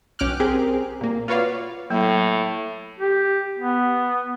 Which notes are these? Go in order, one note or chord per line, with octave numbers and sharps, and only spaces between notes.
B1 C#4 G5 D6 F6 F#6
C4 G4 G#4 A#4
A#2 A#3
F4 F#4 B4 C#5 D5 F5
A2 F#3 A#3
G4
B3